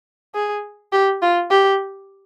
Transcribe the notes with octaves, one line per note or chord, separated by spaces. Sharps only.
G#4
G4
F4
G4